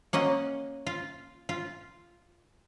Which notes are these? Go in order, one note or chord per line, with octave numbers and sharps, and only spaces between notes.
A#3 C#4 D#5 F#5
F4
F4